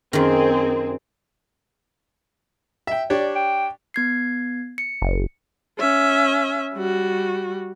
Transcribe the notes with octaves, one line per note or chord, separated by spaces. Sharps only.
F#2 D#3 C4 G#4
E5 G5
D4 G4 C#5 D5
G5
B3 G#6 C7
C#7
F#1
C#4 E5
G3 F#4